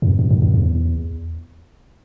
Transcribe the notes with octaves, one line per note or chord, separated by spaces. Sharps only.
F#2
F2
F2
F#2
F2
E2